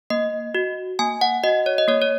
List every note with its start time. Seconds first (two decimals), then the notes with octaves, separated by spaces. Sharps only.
0.10 A#3 D#5
0.55 F#4
0.99 A#3 G#5
1.21 F#5
1.44 F#4 D#5
1.66 C#5
1.78 D#5
1.88 A#3 C#5
2.02 C#5